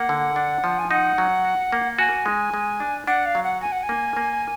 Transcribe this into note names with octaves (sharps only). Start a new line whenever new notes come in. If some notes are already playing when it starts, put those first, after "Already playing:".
Already playing: A#3 F#5
D3
D4
F3
G#5
D#4 F#5
F#3
F#4
A#3
F#4 G#5
G#3
G#3
D4
D4 F#5
F5
F#3
F#5
F#4 G#5
F#5
G#5
A#3
A#3